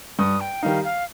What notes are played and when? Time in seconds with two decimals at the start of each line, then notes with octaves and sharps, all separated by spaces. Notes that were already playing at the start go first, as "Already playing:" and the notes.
0.19 G2 D#6
0.41 G5
0.63 D#3 G3 D#4 F5
0.85 F5